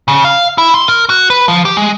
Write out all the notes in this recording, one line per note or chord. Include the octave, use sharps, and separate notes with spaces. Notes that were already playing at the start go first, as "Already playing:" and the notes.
C#3
F5
E4
C6
A#4
F#4
B4
F3
G4
G#3